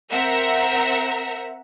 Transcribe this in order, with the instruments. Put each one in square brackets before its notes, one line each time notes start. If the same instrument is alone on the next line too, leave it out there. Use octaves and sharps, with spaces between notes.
[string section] C4 A#4 E5 F#5 A#5